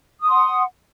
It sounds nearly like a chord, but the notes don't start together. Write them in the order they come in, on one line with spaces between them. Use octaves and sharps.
D#6 C6 F#5